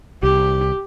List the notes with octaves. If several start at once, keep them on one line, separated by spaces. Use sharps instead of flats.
C2 G4